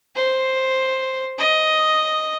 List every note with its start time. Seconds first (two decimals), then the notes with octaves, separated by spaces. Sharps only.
0.16 C5
1.38 D#5